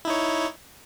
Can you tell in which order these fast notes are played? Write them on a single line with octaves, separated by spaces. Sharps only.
E4 D#4 C#5